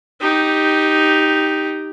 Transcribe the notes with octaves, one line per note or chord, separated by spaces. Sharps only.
D#4 G4